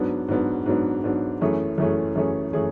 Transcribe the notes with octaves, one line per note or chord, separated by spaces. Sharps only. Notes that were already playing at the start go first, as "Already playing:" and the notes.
Already playing: G#2 F#3 B3 D4
G#2 F#3 B3 D4
G#2 F#3 B3 D4
G#2 F#3 B3 D4
F#2 E3 A3 C#4 G#4
F#2 E3 A3 C#4 G#4
F#2 E3 A3 C#4 G#4
E3 A3 C#4 G#4